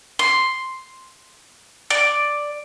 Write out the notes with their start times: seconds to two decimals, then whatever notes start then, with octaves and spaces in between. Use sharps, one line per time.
0.19 C6
1.90 D5